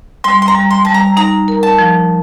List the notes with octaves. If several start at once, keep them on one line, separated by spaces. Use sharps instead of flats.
G3 C6
C6
A#5
G3
C6
G3 A5
A#5
D#4 A#5
A#4
A5
F3